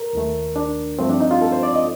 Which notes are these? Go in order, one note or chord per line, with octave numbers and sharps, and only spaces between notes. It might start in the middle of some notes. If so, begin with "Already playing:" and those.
Already playing: A#4
D#2 D#3 A3
D4
G2 F3 A3 C4
D4
D#4
F4
A4
C5
D5
D#5